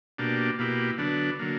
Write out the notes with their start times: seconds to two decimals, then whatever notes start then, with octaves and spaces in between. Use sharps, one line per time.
0.18 B2 A#3 D4 G4
0.59 B2 A#3 E4 G4
0.98 D3 F#3 B3 D4
1.39 D3 F#3 A#3